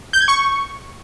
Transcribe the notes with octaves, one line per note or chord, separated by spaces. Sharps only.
G6
G#6
C#6